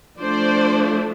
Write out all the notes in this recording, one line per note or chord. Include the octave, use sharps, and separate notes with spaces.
F3 A3 D4 C5 D5